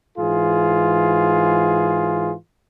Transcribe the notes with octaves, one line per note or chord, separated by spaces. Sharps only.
G#2 E3 F4 G#4